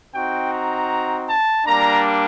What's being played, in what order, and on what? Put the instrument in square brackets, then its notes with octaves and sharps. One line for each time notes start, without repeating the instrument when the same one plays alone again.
[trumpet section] C4 D#4 F#4 G5
A#5
A5
G3 A#3 D4 A#5